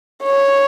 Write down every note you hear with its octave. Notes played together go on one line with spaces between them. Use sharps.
C#5